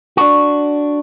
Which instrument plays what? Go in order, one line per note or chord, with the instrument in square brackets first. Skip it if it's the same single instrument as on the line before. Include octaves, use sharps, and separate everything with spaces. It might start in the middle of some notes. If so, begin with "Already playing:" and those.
[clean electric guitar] D4 F#4